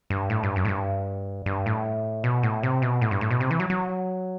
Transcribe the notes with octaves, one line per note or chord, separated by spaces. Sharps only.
G2
A2
G2
F#2
A2
G2
G2
A2
B2
A2
C3
B2
A2
G2
A2
B2
C3
E3
F#3
F#3